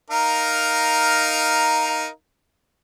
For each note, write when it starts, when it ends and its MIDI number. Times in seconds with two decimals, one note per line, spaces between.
0.10 2.07 63
0.10 2.07 70
0.10 2.07 77